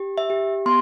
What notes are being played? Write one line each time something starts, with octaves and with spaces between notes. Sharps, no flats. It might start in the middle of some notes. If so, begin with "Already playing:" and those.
Already playing: G4
E5
G4
B3 C6